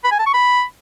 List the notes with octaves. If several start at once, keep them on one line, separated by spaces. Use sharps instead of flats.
B5
G#5
A5
C#6
B5